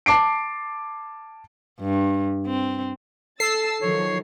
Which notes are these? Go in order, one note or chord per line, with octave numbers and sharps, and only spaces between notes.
A5 D6 C7 D7
G2
C4
A4 E6 A6 C7
D#3 F3 F#3 C#5